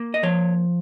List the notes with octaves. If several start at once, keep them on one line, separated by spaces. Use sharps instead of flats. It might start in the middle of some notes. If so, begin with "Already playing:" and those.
Already playing: A#3
D#5
F3 C#5